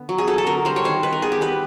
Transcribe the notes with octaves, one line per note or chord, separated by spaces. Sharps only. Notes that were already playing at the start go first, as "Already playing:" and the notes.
Already playing: D3 B3
F#3
G#4
F#3 A4
A4
D3 A#4
G3 C5
C#5
D#3 C5
D#3 B4
A#4
B3 G#4
G4
G3 B4